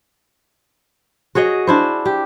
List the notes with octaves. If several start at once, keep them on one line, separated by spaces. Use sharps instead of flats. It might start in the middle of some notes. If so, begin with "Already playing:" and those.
F#4 G#4 C#5 D#5
D4 E4 C5
G4